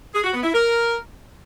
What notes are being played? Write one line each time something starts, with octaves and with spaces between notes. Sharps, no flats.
G#4
F#4
B3
E4
A#4